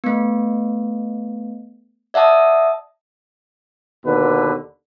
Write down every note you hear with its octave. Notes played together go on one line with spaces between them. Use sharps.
A3 B3
D5 E5 F#5 A5 D#6
D#2 B2 D3 B4